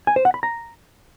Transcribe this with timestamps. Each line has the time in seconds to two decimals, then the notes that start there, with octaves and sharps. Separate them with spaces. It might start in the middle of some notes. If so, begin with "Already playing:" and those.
0.07 G#5
0.16 C5
0.25 F#5
0.34 B5
0.43 A#5